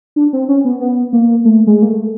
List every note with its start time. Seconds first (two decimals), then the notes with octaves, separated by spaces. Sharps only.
0.16 D4
0.33 C4
0.49 C#4
0.65 B3
0.80 B3
1.13 A#3
1.45 A3
1.67 G#3
1.82 A#3
1.88 A3